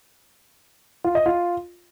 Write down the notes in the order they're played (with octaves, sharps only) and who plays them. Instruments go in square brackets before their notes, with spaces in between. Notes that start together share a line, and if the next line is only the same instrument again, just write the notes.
[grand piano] F4
D#5
F4